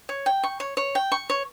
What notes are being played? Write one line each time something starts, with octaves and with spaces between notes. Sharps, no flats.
C#5
G5
C#6
C#5
C#5
G5
C#6
C#5